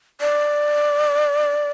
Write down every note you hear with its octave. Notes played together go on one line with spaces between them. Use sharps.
D5